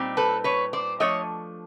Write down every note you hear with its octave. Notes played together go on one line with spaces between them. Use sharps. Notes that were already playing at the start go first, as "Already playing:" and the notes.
Already playing: A#2 G3 C4 D#4
A4 B4
B4 C#5
C5 D5
F3 A3 D4 C#5 D#5